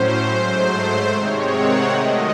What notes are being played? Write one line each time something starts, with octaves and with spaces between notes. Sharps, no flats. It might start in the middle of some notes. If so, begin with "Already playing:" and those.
Already playing: A2 F#3 C#4 C5
G#2 F#3 A3
C3 D#3 G#3 C4 C#5
F#5
C3 D#3 F#3 A3 D#5